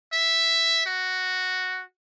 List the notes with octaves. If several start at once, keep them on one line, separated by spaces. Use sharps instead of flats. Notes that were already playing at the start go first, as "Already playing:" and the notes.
E5
F#4